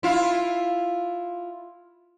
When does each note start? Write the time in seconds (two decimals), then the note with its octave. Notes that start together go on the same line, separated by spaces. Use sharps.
0.03 E4 F4